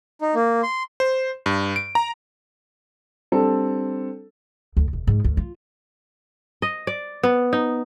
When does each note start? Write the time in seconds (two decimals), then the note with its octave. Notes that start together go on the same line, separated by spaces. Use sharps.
0.22 D#4
0.35 A#3
0.63 C6
1.00 C5
1.46 G2
1.76 D7
1.95 A#5
3.32 G3 C4 D4 A4
4.77 D2
4.93 E1
5.07 G#2
5.24 D2
5.37 F4
6.62 D#5
6.87 D5
7.23 B3
7.53 D#4